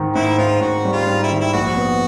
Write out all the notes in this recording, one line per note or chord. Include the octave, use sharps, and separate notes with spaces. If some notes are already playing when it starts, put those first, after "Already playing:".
Already playing: G#2 D#3
G#2 E4
G#2 F4
G#2 F#4
G3
F4
G#2
E4
D#3
E4
A#1 F#4
B3